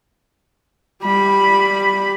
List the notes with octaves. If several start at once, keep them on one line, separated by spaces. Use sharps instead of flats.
G3 B5